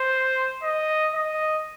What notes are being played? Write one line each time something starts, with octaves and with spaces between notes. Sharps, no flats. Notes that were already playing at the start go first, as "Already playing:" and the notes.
Already playing: C5
D#5
D#5